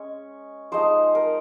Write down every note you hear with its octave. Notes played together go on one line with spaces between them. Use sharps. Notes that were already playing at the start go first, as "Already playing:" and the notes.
Already playing: G#3 C#4 C#5
F3 G#3 D#4 C5
A#4